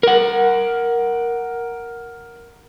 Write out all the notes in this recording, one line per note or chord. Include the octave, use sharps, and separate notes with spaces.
A#4 F#5